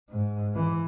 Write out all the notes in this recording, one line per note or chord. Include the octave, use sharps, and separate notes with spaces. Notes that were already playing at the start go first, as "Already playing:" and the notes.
G#2
E3